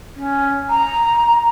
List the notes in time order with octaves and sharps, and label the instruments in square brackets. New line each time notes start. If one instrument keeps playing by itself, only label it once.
[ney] C#4
A#5